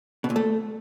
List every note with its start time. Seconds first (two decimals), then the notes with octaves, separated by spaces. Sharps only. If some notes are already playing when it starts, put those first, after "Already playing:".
0.24 B2
0.30 A#2
0.36 A3